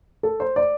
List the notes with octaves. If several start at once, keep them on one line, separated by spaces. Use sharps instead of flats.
A4
C5
D5